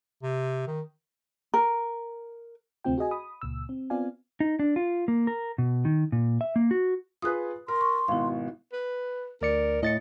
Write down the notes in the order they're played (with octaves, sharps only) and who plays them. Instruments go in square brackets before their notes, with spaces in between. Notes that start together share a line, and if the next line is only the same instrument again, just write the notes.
[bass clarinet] C3
D#3
[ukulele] A#4
[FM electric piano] D2 C3 A3 C4 F4 G5
F#4 G#4 D#5 G#5
B5 D#6
C#2 A#2 E6
C4
B3 C4 F4 D5 F5 G#5
[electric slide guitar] D#4
D4
F4
A#3
A#4
B2
D#3
A#2
E5
A#3
F#4
[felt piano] F4 G#4 B4 [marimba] D#6 F#6
[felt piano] A#4 [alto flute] C6
[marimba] C#6
[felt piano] G#1 B2 [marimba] E4 F5
[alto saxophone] B4
[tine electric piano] D2 D5 C#7 [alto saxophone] A#4
[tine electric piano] A2 A6 C#7 [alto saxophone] D#5